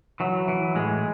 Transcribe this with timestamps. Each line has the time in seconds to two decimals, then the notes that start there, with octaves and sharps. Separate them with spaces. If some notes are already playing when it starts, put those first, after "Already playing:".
0.20 E3 F#3
0.48 E3
0.75 A2 G#3